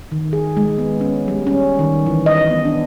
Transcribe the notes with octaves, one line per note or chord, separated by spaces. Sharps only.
D#3
G#4
G#3
B3
C#4
G3
C#4
D#3
E3
D#5
B3
D4